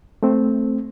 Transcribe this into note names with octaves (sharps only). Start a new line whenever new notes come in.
A3 C4